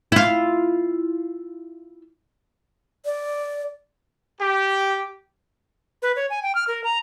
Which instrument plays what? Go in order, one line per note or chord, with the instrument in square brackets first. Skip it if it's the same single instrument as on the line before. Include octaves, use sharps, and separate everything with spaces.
[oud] E4 F4
[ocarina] D5
[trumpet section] G4
[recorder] B4
C#5
G#5
G5
F6
A#4
A#5